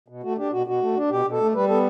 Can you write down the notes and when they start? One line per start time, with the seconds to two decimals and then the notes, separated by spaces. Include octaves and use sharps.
0.08 B2
0.23 A3 F#4
0.38 D4 G4
0.52 B2 F#4
0.66 B2 F#4
0.82 A3
0.96 D4
1.10 B2 G4
1.26 B2
1.32 A4
1.40 A3
1.54 G3 B4
1.68 B3 A4